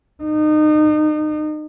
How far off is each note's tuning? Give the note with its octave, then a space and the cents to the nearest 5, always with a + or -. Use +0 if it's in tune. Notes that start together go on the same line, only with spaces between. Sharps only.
D#4 -30